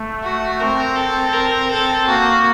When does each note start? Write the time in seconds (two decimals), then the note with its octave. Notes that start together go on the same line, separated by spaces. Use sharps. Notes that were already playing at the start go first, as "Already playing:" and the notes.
Already playing: A3
0.23 F#4
0.60 C4 A#4
0.96 A4
1.33 A#4
1.71 A4
2.07 A#3 F#4